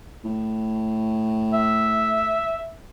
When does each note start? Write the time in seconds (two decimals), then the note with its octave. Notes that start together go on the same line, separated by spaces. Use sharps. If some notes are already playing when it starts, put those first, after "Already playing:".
0.25 A2
1.53 E5